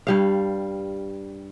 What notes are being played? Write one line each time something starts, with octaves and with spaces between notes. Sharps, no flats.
G2 G3 F5